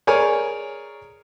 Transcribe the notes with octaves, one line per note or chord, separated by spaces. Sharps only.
G#4 A#4 C#5 D5 G#5